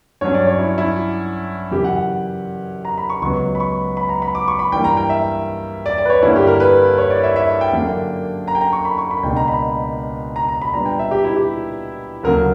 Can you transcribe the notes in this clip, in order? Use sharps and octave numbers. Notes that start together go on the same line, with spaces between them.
G2 F#3 C#4 C#5
D5
C#5
E4
E4
F#2 C#3 E3 G4
F#5
F#5
A#5
B5
C#6
C#2 C#3 F#3 B3 C#6
B5
C#6
B5
A#5
B5
D6
C#6
B5
G2 E3 G3 A#3 G5
A#5
G5
E5
D5
D5
B4
C#5
G2 D3 G3 A#3 E4
G4
A#4
B4
C#5
D5
E5
E5
G5
F#2 D3 A#3 D4
A#5
G5
A#5
C#6
B5
C#6
B5
C#2 B2 A#3 D4 G5
A#5
B5
A#5
A#5
B5
A#2 G3 B3 D4 A#5
G5
E5
G4
E4
G4
D2 C#3 F#3 A#3 A#4